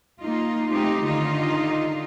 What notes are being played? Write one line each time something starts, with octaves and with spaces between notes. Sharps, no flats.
A#3 D#4 F4
A3 C4 D#4 F4 G4
D3 D#3 D#4 F4